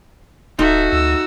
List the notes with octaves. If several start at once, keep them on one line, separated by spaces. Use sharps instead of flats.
D1 D#4 F#4 A4 E5
D2 E6